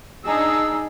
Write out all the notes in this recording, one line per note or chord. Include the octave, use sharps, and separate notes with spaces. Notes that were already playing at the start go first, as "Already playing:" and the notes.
D4 D#4 G#4 E6